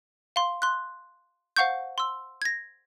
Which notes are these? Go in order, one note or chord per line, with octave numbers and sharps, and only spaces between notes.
F5 C6
C6 F#6
C5 F5 F#5 C#6 G6
C6 E6
G#6 A#6